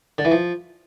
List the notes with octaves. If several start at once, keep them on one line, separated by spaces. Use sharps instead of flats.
D3
E3
F3